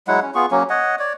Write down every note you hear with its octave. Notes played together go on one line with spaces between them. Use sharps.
F#3 G#3 E4 F#5
C#4
B3 F4 G#4 C#6
F#3 A#3 C#4
C#5 D#5 F#5
C#5 D5